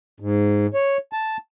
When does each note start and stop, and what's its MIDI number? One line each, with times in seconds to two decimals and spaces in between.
0.20 0.67 44
0.74 0.97 73
1.13 1.37 81